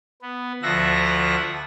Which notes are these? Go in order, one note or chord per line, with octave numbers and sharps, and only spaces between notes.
B3
D2 F3 E5 F#5 A#6